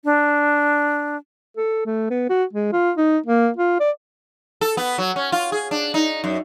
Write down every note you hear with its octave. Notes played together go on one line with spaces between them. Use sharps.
D4
A4
A3
B3
F#4
G#3
F4
D#4
A#3
F4
D5
A4
B3
F#3
C#4
F4
G#4
D4
D#4
F#2